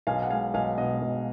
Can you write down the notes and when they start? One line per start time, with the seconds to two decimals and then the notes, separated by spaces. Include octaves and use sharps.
0.07 B1 F5 G#5
0.22 F#5
0.30 G#3 F5 G#5
0.54 B1 F5 G#5
0.78 B2 D#5 F#5
1.02 B1